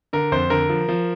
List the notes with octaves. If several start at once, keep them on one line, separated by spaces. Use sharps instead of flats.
D3 A#4
F2 C5
D3 A#4
F3
F3